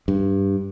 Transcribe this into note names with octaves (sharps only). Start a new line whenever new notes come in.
G2